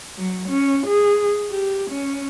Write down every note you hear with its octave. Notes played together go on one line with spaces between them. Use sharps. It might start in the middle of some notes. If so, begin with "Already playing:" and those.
F#3
C#4
G#4
G4
C#4